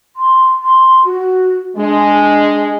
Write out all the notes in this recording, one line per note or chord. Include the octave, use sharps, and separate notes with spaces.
C6
C6
F#4
G#3 D4